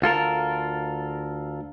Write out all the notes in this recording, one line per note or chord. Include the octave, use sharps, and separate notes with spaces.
D2 F4 A4 A#4